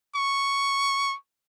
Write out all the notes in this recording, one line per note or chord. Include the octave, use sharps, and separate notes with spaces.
C#6